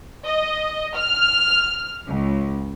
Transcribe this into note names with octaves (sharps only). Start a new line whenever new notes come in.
D#5
F6
C#2